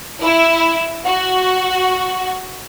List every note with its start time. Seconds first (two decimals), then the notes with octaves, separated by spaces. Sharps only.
0.21 E4
1.05 F#4